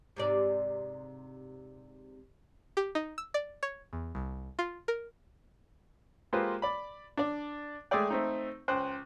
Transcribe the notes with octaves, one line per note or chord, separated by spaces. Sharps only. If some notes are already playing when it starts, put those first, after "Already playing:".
G#2 C3 D5
G4
D#4
E6
D5
C#5
E2
C2
F4
A#4
G#3 A#3 F4 G4 B4 C5
D5 B5
D4 D5
G#3 A3 G#4 A4 D5 G5
A3 C4 D#4
C#2 C5 G5 F#6